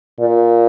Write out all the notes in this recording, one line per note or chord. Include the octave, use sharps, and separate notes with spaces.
A#2